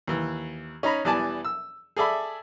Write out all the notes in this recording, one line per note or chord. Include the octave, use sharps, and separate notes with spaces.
D#2 E3
C#4 D#4 A#5 B5
E2 E3 G3 D5 G#5 A5
E6
G#4 A4 D5 E5 B5